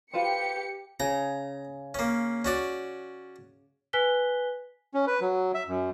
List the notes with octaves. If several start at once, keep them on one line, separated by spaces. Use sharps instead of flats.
F4 G4 B4 C5 C#7
C#3 A#5
A#3 C#4
C#4 F#4 D5
B4 G#5 F#6 B6 G7
C#4
B4
F#3
E5
F#2